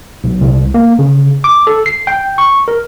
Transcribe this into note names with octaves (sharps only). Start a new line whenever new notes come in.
B1
C2
A#3
C#3
D6
A4
C7
G5
C#6
A#4